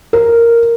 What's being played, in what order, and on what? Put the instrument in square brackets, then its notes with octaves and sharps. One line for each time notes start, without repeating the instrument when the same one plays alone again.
[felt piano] A#4